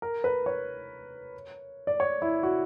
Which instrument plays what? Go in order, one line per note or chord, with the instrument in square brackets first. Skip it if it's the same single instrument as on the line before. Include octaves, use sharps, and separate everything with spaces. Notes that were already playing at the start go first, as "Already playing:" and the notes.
[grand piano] A#4
B4
C#5
D5
C#5
E4
F#4